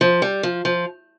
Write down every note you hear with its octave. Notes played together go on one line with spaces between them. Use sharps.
F3
G3
F3
F3